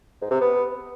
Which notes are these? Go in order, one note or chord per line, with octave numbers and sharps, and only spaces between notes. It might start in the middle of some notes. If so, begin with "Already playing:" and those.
G#2
C3
B3